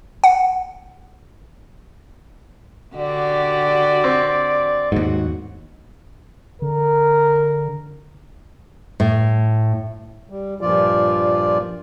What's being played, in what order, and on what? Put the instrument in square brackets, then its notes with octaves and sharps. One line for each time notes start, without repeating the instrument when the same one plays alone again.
[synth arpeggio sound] F#5
[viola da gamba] D3 F#4 G4 [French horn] D5
[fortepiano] C4
[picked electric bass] D#2 G#2 [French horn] F#4
[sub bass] D3 [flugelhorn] A#4
[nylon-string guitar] A2
[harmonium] G3
G2 A#2 F3 F4 D5